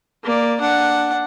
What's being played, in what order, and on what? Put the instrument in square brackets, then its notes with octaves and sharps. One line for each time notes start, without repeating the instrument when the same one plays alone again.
[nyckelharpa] A#3 D5
D4 F#5